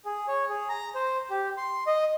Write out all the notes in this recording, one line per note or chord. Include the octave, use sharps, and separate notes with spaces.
G#4
C#5
G#4
A#5
C5
G4
C6
D#5